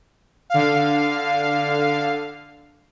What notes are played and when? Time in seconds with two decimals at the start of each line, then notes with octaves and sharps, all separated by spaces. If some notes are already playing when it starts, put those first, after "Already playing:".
0.50 D3 F5